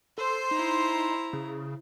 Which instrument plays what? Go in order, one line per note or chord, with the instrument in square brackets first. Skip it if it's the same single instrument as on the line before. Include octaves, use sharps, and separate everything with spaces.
[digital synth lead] A4 [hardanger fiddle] C5 C6
[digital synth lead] D#4 [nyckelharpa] E4 A#5
[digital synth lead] C#3